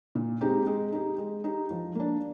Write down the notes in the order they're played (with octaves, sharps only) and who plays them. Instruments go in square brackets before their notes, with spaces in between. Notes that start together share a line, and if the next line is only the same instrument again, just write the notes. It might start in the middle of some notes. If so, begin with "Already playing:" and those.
[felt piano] A#2
G#3 C4 D#4 G4
G#3
D#4 G4
G#3
D#4 G4
F3
A#3 D4